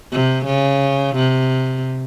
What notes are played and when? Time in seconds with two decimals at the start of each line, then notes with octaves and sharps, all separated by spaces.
0.12 C3
0.46 C#3
1.16 C3